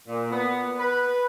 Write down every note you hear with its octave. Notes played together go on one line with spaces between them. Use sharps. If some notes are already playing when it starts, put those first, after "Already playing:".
A#2
B3
B4